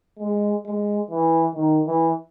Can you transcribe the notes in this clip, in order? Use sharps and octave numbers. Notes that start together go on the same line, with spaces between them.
G#3
G#3
E3
D#3
E3